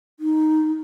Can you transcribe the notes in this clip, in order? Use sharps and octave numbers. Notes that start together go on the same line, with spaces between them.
D#4